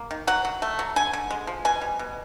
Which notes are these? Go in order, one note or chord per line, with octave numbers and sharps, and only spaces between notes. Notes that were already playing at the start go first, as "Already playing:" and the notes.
Already playing: A#3
D#3
F#3 F#5
F#3
A3
F#3
D3 G#5
D3
G#3
F3
B2 G#5
G3
B2